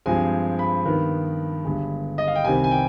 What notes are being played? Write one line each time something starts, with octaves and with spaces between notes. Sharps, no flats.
G2 F3 G#3 C4 G#5
B5
G2 D#3 B3
G1 G2 D3 G#3
D#5
F5
G5
C2 C3 D#3 G3 C4 G#5
G#5
G5